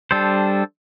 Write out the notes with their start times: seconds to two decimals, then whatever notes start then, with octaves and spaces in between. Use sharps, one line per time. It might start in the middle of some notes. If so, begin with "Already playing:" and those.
0.11 G3 D4 A4 C5